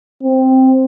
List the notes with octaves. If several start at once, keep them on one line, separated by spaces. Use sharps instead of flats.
C4